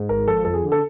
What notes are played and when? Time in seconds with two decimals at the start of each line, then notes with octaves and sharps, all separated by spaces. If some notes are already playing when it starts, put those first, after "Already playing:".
Already playing: G#2
0.09 G#1 A#4
0.27 F3 A4
0.45 F2 A4
0.54 G#4
0.63 D3
0.72 A4